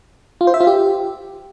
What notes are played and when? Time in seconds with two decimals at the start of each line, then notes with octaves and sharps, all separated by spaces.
0.41 F4
0.47 C5
0.54 E5
0.60 F4
0.67 G4